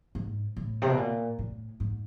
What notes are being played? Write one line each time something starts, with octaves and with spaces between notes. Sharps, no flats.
G#2
A2
C3
B2
A#2
A2
G#2